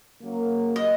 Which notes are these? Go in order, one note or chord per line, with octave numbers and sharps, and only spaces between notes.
C#3 F#3 A#3
D#5